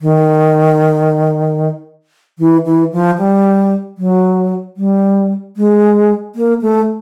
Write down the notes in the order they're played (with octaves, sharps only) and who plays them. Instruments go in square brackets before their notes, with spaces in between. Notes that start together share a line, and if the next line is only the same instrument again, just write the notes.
[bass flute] D#3
E3
E3
F3
G3
F#3
G3
G#3
A#3
A3